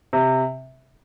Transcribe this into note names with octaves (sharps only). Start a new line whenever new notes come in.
C3